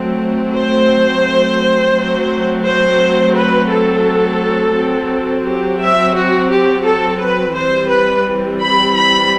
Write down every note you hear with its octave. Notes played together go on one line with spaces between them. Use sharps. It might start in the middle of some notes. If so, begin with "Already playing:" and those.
Already playing: F#3 A3 C4
C5
F#3 A3 C4
C5
B4
A4
F#3 C4
G4
E5
F#4
G4
A4
B4
E3 G3 C4 C5
B4
B5
B5